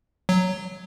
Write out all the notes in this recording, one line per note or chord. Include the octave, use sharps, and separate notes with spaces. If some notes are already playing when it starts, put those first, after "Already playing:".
F#3